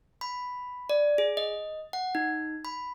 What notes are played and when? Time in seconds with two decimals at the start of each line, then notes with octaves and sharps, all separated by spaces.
0.21 B5
0.90 D5
1.18 G#4
1.37 D#5
1.93 F#5
2.15 D#4
2.65 B5